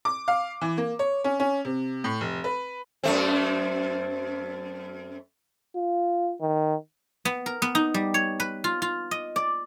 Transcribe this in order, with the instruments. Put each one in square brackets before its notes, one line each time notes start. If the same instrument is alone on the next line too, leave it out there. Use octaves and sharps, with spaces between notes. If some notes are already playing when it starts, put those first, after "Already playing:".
[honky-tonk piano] D6
F5
E3
A#3
C#5
C#4
C#4
C3
A2
F1
B4
[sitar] F#2 A3 C4
[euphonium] F4
D#3
[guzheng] B3
A#4
B3
D#4
G3
C#5
B4
F4
F4
D#5
D5